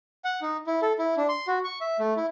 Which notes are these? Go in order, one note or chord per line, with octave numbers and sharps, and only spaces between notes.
F#5
D#4
E4
A4
E4
D4
C6
F#4
C#6
E5
A3
E4